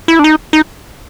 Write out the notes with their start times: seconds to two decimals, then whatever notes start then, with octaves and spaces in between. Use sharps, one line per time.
0.08 E4
0.19 D4
0.24 D#4
0.53 D#4